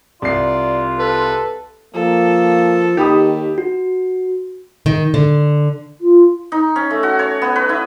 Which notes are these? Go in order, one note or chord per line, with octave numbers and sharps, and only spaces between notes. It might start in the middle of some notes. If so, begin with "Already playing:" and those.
C2 F4 D5 C7
A4 B4
F3 A#3 A4
D#2 D#3 G4 B5 D#6
F#4
D#3
D3
F4
D#4
C#4
A3
F#4
C#5
B3
B4
E4